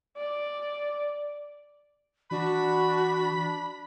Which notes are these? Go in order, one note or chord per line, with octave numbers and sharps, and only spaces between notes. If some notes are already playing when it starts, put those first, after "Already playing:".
D5
E3 D4 F#4 B5